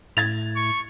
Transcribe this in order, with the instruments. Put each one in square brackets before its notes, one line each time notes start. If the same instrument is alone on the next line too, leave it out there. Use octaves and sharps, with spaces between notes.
[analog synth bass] A2 [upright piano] G#6 A6 F7
[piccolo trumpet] C#6